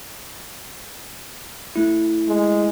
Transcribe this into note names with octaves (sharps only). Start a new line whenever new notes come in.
A3 E4
G#3